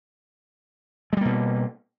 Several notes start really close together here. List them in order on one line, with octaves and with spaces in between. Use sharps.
G#3 G3 A#3 B2